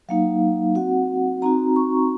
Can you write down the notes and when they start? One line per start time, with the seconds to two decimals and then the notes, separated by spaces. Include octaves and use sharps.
0.09 F#3 A#3 D#4 F5
0.75 C4 F#4 F#5
1.42 C4 D#4 F#4 A#5
1.76 C#6